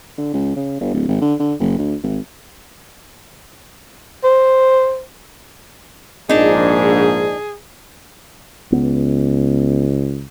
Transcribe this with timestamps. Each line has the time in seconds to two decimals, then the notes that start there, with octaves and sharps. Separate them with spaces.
0.18 D3
0.34 C#2
0.56 C#3
0.80 G1
0.94 D1
1.09 G#1
1.21 D3
1.40 D3
1.60 F#1
1.78 D2
2.03 G#1
4.24 C5
6.29 A#1 G#2 D4 D#4 G#4
8.72 C#2 B3